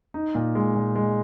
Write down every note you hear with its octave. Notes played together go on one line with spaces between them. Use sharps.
D#4
A#2
G#3
A#2
G#3